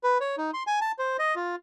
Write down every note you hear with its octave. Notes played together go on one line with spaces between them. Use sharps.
B4
C#5
D#4
C6
G#5
A5
C5
D#5
F4